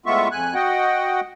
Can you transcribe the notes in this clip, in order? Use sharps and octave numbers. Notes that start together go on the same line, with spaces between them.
A2 G#3 B3 F4 E5 C#6
F2 G#5 F#6
F#4 D#5 F#5 G5